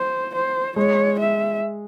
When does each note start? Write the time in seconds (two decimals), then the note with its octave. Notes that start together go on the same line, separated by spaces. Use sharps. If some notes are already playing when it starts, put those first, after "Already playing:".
Already playing: C5
0.35 C5
0.76 G#3 C#5
1.19 E5